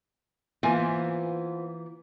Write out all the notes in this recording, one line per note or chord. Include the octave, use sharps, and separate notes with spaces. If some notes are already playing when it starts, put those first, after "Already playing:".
E3 A#3 B3 F4 C5 G#5